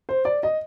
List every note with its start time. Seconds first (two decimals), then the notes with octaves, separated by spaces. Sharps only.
0.09 C5
0.25 D5
0.43 D#5